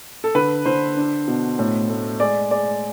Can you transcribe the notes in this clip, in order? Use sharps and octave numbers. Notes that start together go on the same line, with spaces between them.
A4
D3 B4
D3 C5
D4
B2
A2
A3
G#3 D5
G#3 D5